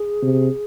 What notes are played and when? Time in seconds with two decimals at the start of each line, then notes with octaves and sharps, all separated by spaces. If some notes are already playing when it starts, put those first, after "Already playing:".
Already playing: G#4
0.22 C3